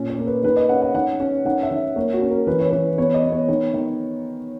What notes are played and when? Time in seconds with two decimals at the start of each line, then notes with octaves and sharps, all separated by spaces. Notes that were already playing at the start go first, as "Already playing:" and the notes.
Already playing: A#2 C#4
0.10 C#5
0.19 A#3
0.27 B4
0.43 D#3 B4
0.56 D#5
0.69 C#4 F#5
0.82 F#5
0.94 D#3 F#5
1.20 C#4
1.45 D#3 F#5
1.63 E5
1.71 D#3
1.96 A#3 C#5
2.13 F#4
2.21 C#4
2.30 A#4
2.47 E3 B4
2.60 C#5
2.71 E3 B4
2.98 B3 C#5
3.14 D#5
3.24 B3
3.32 C#5
3.48 D#3 C#5
3.73 D#3